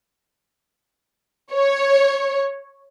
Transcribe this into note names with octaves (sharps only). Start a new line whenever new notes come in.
C#5